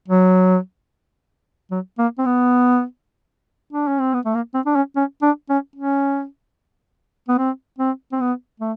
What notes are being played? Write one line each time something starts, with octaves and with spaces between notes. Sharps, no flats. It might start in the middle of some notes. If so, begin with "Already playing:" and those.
F#3
F#3
A#3
C4
B3
D4
C#4
C4
B3
A3
A#3
C4
D4
C#4
C#4
D4
C#4
C#4
B3
C4
C4
C4
B3
A3